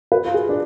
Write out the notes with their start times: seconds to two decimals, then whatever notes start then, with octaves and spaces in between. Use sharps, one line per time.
0.12 B4
0.25 F4
0.34 G#4
0.49 D4